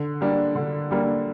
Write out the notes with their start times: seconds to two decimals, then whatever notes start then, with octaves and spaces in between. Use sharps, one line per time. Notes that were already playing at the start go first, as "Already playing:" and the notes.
Already playing: D3
0.21 G3 A#3 D4
0.55 D3
0.91 G3 A#3 D4